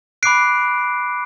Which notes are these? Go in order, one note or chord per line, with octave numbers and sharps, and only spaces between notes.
B5 D6 F#6 C7 D7